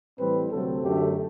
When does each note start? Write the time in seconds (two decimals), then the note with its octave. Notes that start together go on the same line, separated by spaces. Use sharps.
0.18 A2 E3 G3 C4 B4
0.50 D2 C3 F#3 A3 C4 A4
0.82 F#2 D3 F#3 A3 G4